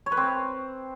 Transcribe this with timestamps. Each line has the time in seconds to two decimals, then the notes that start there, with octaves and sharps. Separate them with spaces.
0.06 C#5
0.12 B4
0.17 C4